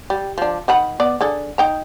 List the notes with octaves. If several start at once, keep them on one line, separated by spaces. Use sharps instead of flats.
G3
F3 D4
D#3 F#5 B5
B3 D5
D3 G#4 A4
D#4 G5 A#5